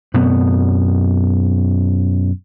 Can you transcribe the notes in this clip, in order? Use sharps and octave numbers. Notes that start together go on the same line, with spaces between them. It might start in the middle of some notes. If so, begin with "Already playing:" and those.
F#2 B2 B3 C4